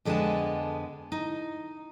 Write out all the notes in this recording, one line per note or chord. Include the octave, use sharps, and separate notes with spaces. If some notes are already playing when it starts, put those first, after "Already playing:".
F2 D3 G#3 B3 G#5 A5
D#4